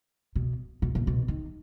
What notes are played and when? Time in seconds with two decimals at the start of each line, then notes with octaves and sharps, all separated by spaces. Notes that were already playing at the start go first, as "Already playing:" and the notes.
0.36 B2
0.82 B2
0.95 A#2
1.07 B2
1.28 D#3